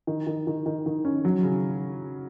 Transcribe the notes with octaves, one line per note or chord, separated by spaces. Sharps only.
D#3
D#3
D#3
D#3
D#3
C#4
F#3
C#3